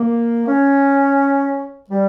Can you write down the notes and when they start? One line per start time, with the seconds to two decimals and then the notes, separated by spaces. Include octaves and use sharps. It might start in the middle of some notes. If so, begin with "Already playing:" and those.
Already playing: A#3
0.47 C#4
1.90 G3